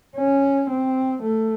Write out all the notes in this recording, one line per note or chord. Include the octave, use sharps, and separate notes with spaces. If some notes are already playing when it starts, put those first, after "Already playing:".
C#4
C4
A3